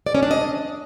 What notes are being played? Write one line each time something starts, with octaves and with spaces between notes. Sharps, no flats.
D5
C#4
D4
D#5